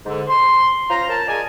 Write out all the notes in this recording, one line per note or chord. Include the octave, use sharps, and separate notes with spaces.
G#2 D3
C6
C#4 F4 C5 A#5
A#4 A5
G#4 A#4 D5 D#5 G#5